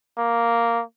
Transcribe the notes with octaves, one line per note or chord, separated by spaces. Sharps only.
A#3